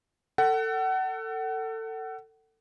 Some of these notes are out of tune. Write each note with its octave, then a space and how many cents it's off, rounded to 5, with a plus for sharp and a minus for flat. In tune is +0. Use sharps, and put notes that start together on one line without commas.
A4 +25 F#5 +30